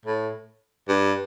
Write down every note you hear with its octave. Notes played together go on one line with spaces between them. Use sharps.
A2
G2